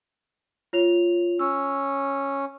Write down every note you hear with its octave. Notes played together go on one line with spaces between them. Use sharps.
F4 C#5 F7
C#4 E6